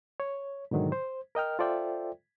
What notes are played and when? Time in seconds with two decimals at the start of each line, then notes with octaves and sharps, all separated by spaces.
0.20 C#5
0.71 G#2 B2 D3 D#3 F#3
0.92 C5
1.35 A#4 D#5 G5 F6
1.59 F4 A4 C5 D5 E5 G5